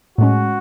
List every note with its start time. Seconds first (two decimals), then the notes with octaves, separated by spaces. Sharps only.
0.18 A2 G#3 C#4 F#4